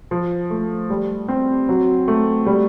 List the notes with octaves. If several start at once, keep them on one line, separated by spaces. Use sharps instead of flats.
F3
A3
G3
C4
F#3
A3
G3